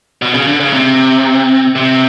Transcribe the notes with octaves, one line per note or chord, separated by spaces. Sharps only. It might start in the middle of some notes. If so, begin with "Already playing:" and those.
B2
C#3
D3
C#3
C3
C3